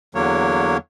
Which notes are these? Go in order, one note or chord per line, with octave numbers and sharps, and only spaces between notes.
E2 D3 F#3 A#3 C#5